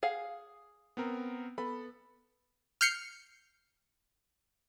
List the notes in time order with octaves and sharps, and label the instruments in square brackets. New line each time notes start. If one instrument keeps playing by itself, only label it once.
[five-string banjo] G#4 F5 F#5
[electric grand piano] B3 C4 A#4
[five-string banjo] B3 [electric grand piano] A4 B5
[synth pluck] F6 G6 C7 C#7